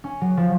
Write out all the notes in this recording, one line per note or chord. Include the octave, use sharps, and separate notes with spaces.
C#4
F#3
F3